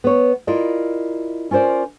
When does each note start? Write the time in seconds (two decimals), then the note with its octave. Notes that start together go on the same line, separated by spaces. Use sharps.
0.04 B3 C#5
0.47 E4 F4 A#4 D5 D#5
1.51 C#4 F4 A#4 C5 D5